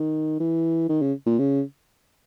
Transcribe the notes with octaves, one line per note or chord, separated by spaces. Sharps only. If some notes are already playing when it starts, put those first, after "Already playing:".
Already playing: D#3
E3
D#3
C#3
A#2
C#3